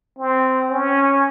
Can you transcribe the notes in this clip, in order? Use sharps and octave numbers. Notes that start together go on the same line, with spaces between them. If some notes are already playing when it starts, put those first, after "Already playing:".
C4
C#4